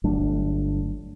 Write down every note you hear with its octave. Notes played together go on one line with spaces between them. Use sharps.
G1 F#3 A3 D4